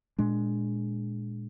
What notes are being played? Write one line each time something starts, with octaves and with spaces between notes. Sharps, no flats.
A#2 G#3 D4